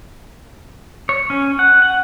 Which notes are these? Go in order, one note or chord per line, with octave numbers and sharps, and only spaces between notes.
C#5
C#4
F#5
F#5